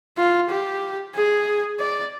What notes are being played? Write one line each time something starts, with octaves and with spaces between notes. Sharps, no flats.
F4
G4
G#4
D5